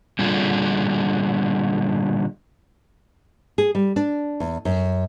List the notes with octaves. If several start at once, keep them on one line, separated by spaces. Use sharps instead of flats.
A#2 D3 G3 F4 G#4
G#4
G3
D4
E2
F#2